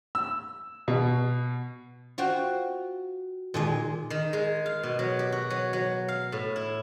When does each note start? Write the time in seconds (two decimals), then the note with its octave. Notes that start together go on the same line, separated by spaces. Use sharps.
0.15 E6
0.88 B2
2.18 F4 F#4 C5 G5
3.54 A#2 D#3 G#3
4.10 D#3
4.33 G#3
4.66 F5
4.83 B2
4.99 F#3
5.19 G4
5.32 F#4
5.50 F#3
5.73 F#3
6.08 F5
6.32 A2
6.56 E4